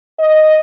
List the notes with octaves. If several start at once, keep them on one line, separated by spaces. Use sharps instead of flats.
D#5